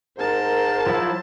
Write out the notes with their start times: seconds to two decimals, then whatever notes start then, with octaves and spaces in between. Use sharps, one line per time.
0.18 G#2 A#4 C5 A5
0.87 F3 F#3 E4